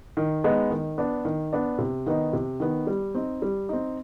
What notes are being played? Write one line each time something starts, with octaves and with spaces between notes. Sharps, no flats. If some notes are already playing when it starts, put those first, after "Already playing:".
D#3
G#3 B3 D#4
D#3
B3 D4
D#3
B3 D4
C3
D#3 B3 D#4
C3
D#3 B3 D#4
G3
C4 D#4
G3
C4 D#4